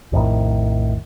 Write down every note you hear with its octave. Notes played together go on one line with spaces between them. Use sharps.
A#1 F2 A2 D#3